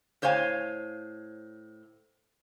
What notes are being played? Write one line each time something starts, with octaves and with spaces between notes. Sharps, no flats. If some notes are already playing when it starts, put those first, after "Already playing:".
A2 C5 C#5 F5 G#5